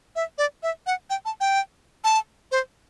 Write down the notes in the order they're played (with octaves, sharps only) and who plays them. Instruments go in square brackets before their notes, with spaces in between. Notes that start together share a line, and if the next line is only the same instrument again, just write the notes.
[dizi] E5
D5
E5
F#5
G5
A5
G5
A5
C5